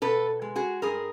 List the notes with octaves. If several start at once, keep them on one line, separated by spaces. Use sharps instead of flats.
B2 A4 B4
G#3
F#4 G#4
G2 G#4 A#4